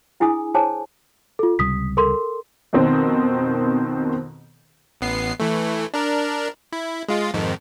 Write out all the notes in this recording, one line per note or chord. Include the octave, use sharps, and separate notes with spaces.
D4 E4 G#4 G#5 D#6
G#4 C5 C#5 G#5 A5
F4 A4
C#2 C3 G3 D#6 B6
A4 A#4 C6
F2 B2 D#3 C4
A1 B3 C7
E3 A3
D4 A#4
E4
G#3 F4
F2 G#2 D#3